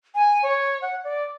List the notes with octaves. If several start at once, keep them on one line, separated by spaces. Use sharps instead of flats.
G#5
C#5
F#5
D5